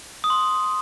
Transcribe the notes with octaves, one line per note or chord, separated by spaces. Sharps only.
D#6
C6